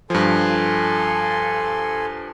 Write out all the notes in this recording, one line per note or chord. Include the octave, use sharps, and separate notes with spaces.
G2 F3 A4 G#5 C6